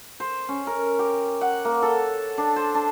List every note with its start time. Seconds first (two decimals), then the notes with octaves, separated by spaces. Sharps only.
0.20 C5
0.49 C#4
0.67 A#4
0.99 G4
1.41 F#5
1.65 A#3
1.82 A4
2.38 D4
2.56 C5
2.75 D4